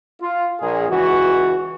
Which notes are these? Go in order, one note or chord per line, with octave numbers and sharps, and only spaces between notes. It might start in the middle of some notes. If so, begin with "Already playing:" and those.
F4
A#1 A#2 G#4
C#2 E3 F#4